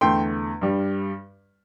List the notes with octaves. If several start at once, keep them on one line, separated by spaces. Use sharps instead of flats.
E2 D3 A3 G5 C6
G2 G3